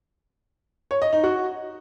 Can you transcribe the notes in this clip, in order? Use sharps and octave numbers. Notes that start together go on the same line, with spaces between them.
C#5
D#5
D#4
F#4